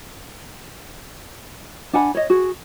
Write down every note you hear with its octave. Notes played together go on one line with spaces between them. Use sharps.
D4 F#5 G#5 B5
C#5 D#5
F#4 G#4